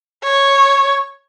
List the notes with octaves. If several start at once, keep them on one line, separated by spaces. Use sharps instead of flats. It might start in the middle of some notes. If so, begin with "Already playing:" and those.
C#5